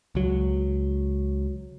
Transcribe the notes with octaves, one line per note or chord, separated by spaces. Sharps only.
C#2 F#3